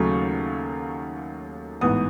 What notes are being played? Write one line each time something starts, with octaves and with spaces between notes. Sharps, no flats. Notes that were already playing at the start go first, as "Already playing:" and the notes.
Already playing: D#2 C#3 F#3 A3 C#6
A1 G#2 E3 B3 D#6